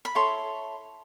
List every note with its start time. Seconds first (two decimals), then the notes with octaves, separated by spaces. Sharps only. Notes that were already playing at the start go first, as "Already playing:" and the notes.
0.05 B5
0.15 E4 A4 C#5 C6